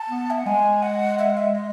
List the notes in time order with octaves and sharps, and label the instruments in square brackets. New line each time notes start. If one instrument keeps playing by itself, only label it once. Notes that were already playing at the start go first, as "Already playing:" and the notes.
Already playing: [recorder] A5
[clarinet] B3
[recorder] E5
F#5
[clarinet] G#3 [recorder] G#5
[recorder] F#5
E5
F#5
E5
D#5